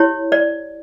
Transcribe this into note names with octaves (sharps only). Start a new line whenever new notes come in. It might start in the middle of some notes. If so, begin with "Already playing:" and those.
Already playing: E4 G4 C#5
D5